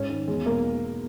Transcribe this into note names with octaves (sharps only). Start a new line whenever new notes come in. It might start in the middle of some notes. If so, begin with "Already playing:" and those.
Already playing: G#2 C#4
D#3
E2 G#3
B2 A#3